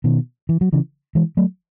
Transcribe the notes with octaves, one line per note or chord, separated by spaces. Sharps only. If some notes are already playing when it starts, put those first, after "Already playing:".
B2 D#3
E3
F#3
C#3 E3
E3 G#3
F#3 A3